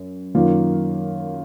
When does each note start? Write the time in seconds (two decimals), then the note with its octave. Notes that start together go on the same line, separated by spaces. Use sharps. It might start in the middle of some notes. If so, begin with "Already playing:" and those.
Already playing: F#2
0.35 F#2 D#3 A#3 F4